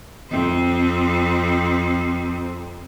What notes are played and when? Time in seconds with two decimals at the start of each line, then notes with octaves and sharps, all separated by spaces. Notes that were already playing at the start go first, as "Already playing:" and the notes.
0.30 F2 C4